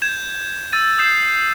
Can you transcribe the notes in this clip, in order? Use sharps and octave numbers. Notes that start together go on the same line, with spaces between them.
G6 G#6 E7
E6 A6 D#7
D#6 G6 C7 E7